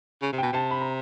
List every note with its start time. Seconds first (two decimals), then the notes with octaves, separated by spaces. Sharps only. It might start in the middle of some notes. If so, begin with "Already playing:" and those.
0.22 C#3
0.32 C3
0.38 B2 G5
0.53 C3 A5
0.71 B5
0.81 A#5